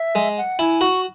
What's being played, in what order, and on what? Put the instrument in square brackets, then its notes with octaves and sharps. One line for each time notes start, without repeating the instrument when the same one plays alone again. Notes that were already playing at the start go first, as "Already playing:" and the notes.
Already playing: [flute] E5
[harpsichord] G#3
[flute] F#5
[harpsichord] E4 [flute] G#5
[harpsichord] F#4 [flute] C#6